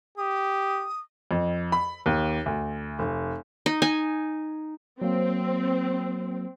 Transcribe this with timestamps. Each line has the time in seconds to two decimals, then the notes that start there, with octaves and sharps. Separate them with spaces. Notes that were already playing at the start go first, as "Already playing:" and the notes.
0.17 G4 D#6
1.31 F2
1.72 B5
2.06 D#2
2.46 D2
2.99 F1
3.66 D#4
3.82 D#4 G#5
5.02 F#3 A#3 C4